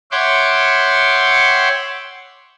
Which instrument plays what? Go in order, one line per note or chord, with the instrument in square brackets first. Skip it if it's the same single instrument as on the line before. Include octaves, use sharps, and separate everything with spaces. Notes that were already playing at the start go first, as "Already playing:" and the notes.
[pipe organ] C#5 E5 F#5 G5 C6 D6